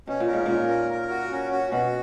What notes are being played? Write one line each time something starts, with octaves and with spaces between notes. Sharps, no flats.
B2 C#4
A#2
A#4
G#2
A#2 C#4
A#4
A#4
F#4
C#4
F#4
B2 F#4